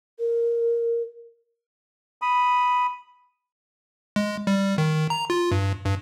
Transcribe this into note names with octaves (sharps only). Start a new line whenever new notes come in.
A#4
B5 D#6
G#3
G3
D#3
A#5
F4
G2
G2